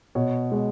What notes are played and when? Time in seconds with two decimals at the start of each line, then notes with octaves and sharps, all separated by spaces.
0.15 B2 C#5
0.52 G#3